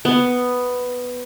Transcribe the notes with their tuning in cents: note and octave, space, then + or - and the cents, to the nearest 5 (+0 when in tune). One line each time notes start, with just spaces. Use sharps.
B3 +5